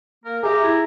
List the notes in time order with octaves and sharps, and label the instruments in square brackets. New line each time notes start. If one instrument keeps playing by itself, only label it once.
[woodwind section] A#3 A#4
[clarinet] G4 [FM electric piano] G#4 E5 [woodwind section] A#5
[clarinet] E4